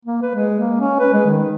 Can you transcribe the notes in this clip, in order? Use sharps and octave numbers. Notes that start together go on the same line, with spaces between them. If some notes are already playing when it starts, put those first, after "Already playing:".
A#3
B4
G#3
A#3
C#4
B4
G#3
D#3